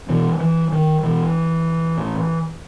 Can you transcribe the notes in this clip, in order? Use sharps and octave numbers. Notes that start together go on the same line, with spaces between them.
B2 E3
E3
D#3
B2 E3
A2